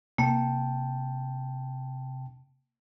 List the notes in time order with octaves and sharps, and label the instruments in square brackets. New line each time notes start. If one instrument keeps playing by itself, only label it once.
[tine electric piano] C3 G5 A5 [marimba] A#3